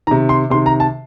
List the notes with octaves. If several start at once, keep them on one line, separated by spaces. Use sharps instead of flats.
C3 D#3 A#5
C6
C3 D#3 C6
A#5
A5